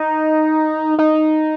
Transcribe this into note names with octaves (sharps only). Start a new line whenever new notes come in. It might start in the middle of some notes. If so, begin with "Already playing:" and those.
Already playing: D#4
D#4